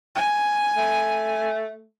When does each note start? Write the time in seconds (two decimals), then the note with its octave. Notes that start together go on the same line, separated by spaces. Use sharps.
0.15 G#5
0.76 A3